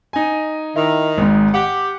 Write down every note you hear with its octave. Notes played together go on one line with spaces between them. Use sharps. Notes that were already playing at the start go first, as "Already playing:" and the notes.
D#4 G#5
D#3 E4
G#1 G#2
G4 F#5